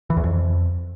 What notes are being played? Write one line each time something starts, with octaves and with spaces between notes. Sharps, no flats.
E3
E2
F2